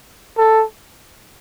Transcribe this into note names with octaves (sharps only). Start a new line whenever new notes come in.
A4